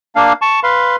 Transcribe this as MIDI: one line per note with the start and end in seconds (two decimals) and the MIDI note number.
0.16 0.33 58
0.16 0.33 62
0.16 0.33 77
0.42 0.60 81
0.42 0.60 85
0.63 0.96 71
0.63 0.96 77
0.63 0.96 84